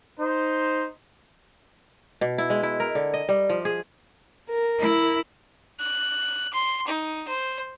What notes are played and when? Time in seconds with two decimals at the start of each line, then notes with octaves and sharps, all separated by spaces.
0.19 D#4 C5
2.21 B2
2.38 E4
2.50 G#3
2.63 E4
2.80 A#4
2.95 D3
3.14 D#5
3.29 G3
3.49 F3
3.65 G#4
4.49 A#4
4.80 E4
5.80 F#6
6.53 C6
6.88 D#4
7.28 C5